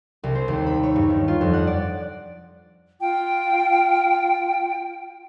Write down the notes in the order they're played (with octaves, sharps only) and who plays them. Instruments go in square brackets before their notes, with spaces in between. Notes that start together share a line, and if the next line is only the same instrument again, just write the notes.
[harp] C2
C5
D#2
B5
C#5
G2
D#3
F4
F2
F#5
D5
[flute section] F4 G5